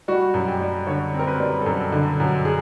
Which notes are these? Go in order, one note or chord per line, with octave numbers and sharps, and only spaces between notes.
G3 F#4
F#2
G4
G3
D3 C#5
C4
A#4
B4
G3
A4
F#2 A#4
D3
F#2
G#4